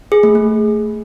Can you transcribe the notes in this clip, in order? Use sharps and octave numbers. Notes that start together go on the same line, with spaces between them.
G#4
A3
A3